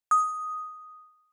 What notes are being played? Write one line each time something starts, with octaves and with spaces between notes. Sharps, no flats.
D#6